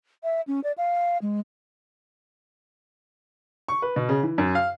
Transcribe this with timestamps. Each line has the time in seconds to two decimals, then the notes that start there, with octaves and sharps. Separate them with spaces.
0.23 E5
0.47 C#4
0.64 D5
0.78 F5
1.22 G#3
3.68 C#6
3.82 B4
3.96 B2
4.09 C#3
4.23 E3
4.38 F#2
4.55 F5